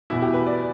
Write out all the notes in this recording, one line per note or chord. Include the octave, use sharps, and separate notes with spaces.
E2 B2 E4
G4
B4
D5